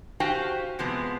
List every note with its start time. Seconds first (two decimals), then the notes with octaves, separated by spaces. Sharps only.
0.20 F#4 G4 C5 F5 G5 G#5
0.79 C3 F3 G#3 B3 C4